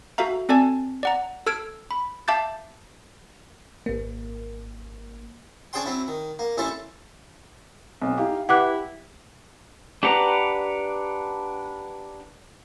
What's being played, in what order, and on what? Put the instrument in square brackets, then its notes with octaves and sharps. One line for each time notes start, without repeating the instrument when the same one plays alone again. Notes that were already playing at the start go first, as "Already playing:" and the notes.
[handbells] F#4 A4 E5 F5 A#5
C4 A4 D5 G#5 A5
D5 F#5 A#5
A4 E6 F6 G#6 D7
B5
E5 F5 A5 D6 G6 A6
[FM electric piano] G#1 A#3
[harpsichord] C#4 D4 G#4 C5 G5 C6
F#3 C4 E4
D#3
A#3
A1 E3 C#4 E4 A4 C5
[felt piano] B1 [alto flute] C4
[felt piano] D#4 E4 G4 [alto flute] F5
[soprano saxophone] E4 [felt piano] G4 [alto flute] B4 [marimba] F#5 D6 F#6
[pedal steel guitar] D4 G4 B4 F#5 A#5